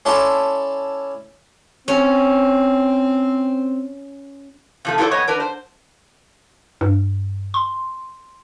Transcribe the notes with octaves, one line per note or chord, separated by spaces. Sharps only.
C#4 E4 A4 D5 A5 C6
C4 C#4
C3 F3 A3
E4 F4 A4 B4 C5 D5
F2 B3 C#5 D#5
D4 A#4 B4
C5
G2
C6